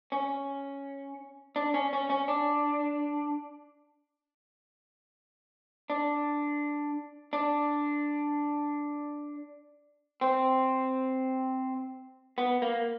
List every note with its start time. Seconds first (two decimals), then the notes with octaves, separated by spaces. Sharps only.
0.12 C#4
1.56 D4
1.74 C#4
1.93 C#4
2.10 C#4
2.28 D4
5.90 D4
7.33 D4
10.21 C4
12.38 B3
12.62 A#3